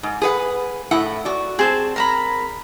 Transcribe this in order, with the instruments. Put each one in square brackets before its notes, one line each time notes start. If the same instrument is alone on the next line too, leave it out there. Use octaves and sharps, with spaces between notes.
[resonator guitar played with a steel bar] G#2
G#4 B4 F#5
A2 E4 F#5
F#4 D5
[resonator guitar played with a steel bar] C4 [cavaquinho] G#4 C5 A5
[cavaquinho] A#4 A#5 B5